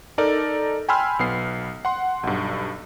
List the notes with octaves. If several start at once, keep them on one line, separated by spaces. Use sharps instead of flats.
D#4 A4 A#4 D5
G5 G#5 B5 C6 E6 F6
B1 B3 C7
F#5 C6
B1 G2